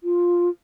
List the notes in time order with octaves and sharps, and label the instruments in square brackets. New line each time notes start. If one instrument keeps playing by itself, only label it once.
[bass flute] F4